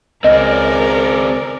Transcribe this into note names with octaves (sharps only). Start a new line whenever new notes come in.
C#2 C4 G#4 A#4 D5 D#5